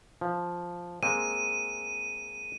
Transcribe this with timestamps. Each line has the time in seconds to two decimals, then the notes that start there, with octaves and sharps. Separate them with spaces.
0.21 F3
1.03 G#3 A#3 C4 D#7